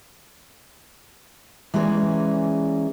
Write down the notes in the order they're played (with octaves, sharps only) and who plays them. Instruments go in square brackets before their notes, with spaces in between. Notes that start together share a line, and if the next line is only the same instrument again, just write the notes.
[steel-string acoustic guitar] E3 G#3 A#3 C#4 G#4 D5